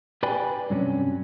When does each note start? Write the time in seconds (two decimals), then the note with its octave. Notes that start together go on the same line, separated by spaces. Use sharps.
0.23 G4 B4 D5 G5 G#5 B5
0.70 G2 C3 F#3 C#4